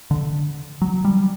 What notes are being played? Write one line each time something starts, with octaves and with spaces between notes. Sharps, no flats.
D3
F#3
G3